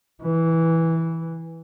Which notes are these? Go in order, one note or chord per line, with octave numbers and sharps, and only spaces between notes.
E3